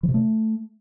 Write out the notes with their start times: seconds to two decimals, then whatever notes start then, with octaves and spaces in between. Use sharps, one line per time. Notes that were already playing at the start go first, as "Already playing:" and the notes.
0.03 E3
0.09 C3
0.14 A3